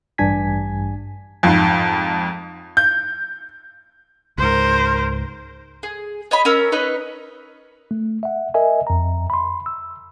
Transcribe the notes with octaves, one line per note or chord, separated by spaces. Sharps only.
A1 G2 D4 G#5 G#6 B6
F2 G#2
G6
C#2 G#2 A#4 C5
G#4
C#5 D#5 B5
C#4 A#4 E6
D#4 B4 C#5 D#5
A3
E5 F#5
A#4 D#5 E5 G#5
F2 A#5
B5 C6
E6